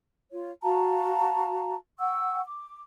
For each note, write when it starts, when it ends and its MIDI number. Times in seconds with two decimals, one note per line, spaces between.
0.30 0.51 65
0.30 0.51 73
0.63 1.75 66
0.63 1.75 77
0.63 1.75 81
0.63 1.75 82
1.99 2.40 78
1.99 2.40 79
1.99 2.40 85
1.99 2.40 88
2.44 2.81 86